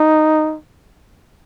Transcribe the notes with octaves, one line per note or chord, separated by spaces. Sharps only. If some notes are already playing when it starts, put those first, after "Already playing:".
Already playing: D#4